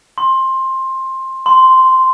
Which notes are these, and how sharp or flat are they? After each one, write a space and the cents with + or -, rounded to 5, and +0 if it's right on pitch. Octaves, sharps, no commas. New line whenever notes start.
C6 +15
C6 -5